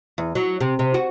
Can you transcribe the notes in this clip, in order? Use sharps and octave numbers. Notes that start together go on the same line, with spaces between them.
E2
F#3
C3
C3
F#4